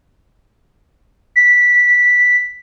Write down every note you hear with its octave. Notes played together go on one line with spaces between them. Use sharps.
B6